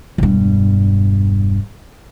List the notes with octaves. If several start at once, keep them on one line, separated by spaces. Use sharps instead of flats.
E1 G2